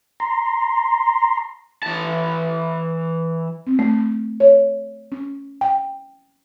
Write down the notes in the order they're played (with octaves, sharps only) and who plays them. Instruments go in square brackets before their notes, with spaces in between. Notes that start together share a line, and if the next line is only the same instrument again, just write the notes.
[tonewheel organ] A#5 C6
[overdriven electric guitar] E3 A5
[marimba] C4
A3
C#5
C#4
G5